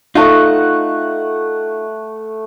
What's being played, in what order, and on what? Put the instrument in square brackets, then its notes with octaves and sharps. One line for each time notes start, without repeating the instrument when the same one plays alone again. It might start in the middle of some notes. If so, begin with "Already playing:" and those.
[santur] A3 F#5 [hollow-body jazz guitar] D#4 F4